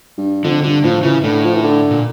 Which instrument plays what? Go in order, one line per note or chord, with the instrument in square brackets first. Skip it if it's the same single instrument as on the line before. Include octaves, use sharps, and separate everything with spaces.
[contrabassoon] G2
[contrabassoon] F2 [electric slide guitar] D3
[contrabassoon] G2 [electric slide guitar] D3
[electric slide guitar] A2 [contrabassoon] F3
[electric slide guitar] C#3 [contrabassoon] E3
[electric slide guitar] A2 [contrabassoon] D3
[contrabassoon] F3
E3
D3
[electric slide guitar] A#2